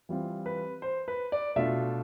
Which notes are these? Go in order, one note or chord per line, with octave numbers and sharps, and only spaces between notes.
E3 G3 C4 F4
B4
C5
B4
D5
B2 A3 D4 F4 E5